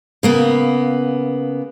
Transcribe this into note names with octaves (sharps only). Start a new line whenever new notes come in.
C#3 A#3 B3